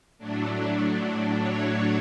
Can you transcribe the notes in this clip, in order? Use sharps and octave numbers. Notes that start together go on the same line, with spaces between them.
A2 F#3 A3 D4
C#5